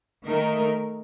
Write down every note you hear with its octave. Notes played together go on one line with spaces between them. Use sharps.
D#3 A3 D#4 A#4